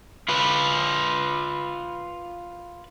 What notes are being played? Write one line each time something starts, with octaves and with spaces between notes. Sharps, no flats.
F4 B4